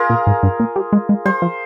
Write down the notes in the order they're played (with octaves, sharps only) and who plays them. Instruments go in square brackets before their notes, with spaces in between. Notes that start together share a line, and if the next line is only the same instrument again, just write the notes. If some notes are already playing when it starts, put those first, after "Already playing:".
Already playing: [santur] F4 G#4 A#4
[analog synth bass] A#2
G#2
G2
A#2
G3
G#3
G#3
[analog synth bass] G3 [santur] C5
[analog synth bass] F3